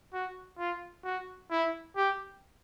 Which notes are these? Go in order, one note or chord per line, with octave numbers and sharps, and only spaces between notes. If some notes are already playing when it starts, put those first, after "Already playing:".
F#4
F4
F#4
E4
G4